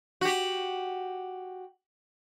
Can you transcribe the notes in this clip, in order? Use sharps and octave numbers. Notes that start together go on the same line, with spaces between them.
F#4 G4